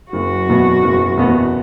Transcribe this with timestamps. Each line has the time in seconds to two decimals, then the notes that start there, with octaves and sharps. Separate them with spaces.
0.12 F#1 F#3 F#4
0.47 E2 B2 B3
0.82 F#1
1.17 E2 B2 B3